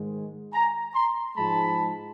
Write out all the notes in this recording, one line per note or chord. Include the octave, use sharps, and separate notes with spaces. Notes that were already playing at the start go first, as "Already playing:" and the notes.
Already playing: G#2 D#3 G#3
G#5 A#5
A#5 C6
G#2 F3 G#3 A5 B5